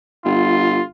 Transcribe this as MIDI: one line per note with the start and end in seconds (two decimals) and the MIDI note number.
0.25 0.81 31
0.25 0.85 65